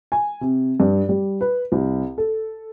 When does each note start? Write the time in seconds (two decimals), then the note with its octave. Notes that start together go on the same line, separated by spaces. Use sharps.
0.12 G#5
0.41 C3
0.80 G2
1.09 G3
1.41 B4
1.72 C2
2.18 A4